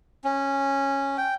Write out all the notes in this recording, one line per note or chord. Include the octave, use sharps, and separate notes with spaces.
C#4
G5